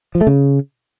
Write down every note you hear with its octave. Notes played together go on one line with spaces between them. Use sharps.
F3
A3
C#3